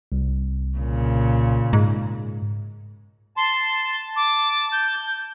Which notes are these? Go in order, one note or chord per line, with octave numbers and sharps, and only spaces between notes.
C2
A#2 C#3
G#2
A5 C6
D6
G6